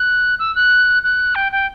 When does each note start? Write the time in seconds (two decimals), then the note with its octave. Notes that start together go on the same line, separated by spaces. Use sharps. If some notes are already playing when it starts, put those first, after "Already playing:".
Already playing: F#6
0.39 E6
0.56 F#6
1.03 F#6
1.35 G5
1.52 G5